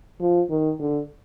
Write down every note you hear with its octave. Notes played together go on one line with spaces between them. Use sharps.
F3
D#3
D3